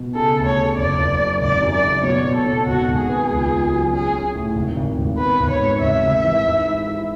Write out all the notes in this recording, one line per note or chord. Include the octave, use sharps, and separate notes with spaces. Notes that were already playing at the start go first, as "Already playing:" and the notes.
Already playing: B2
C#3 A4
D2
C#5
C#3
F#1 D5
F#1
F#2
G#1 D5
F#2
D5
C#3
B2 C#5
B2
A4
B2
G#1 F#4
G#1
G#4
B3
C#2
C#2
F#3
C#4 G#4
C#4
A2
G#1
G#1
G#1
B3 B4
G#1
C#5
G#2
G#1 E5
G#1
E3
G#2
E4
E4